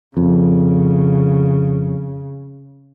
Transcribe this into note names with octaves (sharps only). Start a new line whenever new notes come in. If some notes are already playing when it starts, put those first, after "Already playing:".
F2 C#3